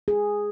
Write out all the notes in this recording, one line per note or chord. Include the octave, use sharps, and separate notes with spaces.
G#4